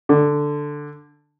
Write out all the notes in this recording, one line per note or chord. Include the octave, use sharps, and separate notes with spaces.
D3